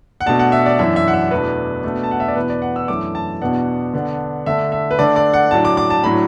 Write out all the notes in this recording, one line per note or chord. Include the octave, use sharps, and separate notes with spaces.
F#5
B2 A3 D4 A5
F#5
E5
D5
F#2 E3 D4 E5
E5
F#5
E5
E2 B2 A3 D4 B4
B2 A3 D4
A5
F#5
E5
D5
E2 B2 B3 D4 B4
D5
F#5
E6
F#2 E3 A3 D4 D6
A5
E2 B2 B3 D4 F#5
D3 B3 D4
D3 A3 D4 E5
E5
B4
D3 A3 D4 D5
D5
F#5
A2 F#3 D4 A5
D6
D6
A5
A2 F#3 A3 D4 B5